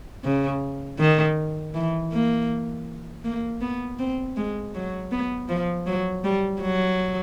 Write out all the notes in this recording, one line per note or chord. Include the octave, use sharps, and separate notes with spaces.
C#3
D#3
E3
A#3
A#3
B3
C4
G#3
F#3
B3
F3
F#3
G3
F#3